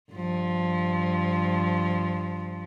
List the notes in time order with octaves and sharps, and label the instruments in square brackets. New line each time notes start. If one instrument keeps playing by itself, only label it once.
[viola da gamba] G2 F3